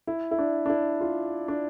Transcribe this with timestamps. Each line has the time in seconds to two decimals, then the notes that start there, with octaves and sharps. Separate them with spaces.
0.07 E4
0.31 E4
0.39 D4
0.66 D4
0.70 E4
1.01 F4
1.48 D4